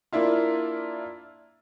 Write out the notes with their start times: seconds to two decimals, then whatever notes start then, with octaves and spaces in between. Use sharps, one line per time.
0.13 A#3 D4 E4 F4